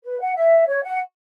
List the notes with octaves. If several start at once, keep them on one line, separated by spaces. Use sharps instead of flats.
B4
F#5
E5
C#5
F#5